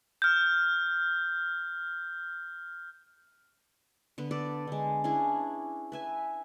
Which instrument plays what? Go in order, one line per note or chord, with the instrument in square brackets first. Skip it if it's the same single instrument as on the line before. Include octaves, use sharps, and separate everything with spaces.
[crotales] F6 G6
[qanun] D3 B3 B4
A4 B4 D5
D3 G#3
C#4 D4 E4 G#4
B4 E5 G#5